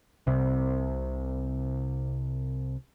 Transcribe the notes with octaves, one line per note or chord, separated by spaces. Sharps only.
C2 C3